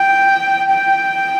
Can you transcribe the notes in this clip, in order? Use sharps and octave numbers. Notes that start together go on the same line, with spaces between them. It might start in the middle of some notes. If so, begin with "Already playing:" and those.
Already playing: G5
G5